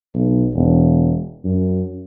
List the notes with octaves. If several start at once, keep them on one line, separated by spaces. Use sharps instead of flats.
B1
E1
F#2